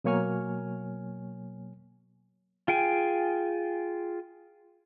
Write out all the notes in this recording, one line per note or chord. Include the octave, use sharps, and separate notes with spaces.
B2 F#3 A#3 C#5 G#5 F6
F4 G#4 G5 G#5